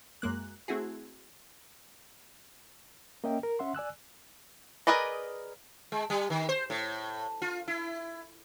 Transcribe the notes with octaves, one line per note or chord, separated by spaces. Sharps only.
F#2 G#3 A#3 F#6
A3 C4 E4 F#4 G#4
A#3 C#4 D#5 E5 G5
A#4
C#4 E5 F#5 C6
D5 G#5 E6 F#6
G#4 A#4 B4 D5 D#5
G#3
G3
D#3
C5
A2
F4
E4